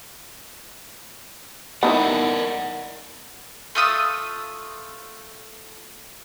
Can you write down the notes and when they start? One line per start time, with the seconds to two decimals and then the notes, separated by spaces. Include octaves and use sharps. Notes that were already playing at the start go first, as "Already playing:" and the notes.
1.83 B3 D#4 E4 A#4 D5 F#5
3.75 A3 F4 D#6 E6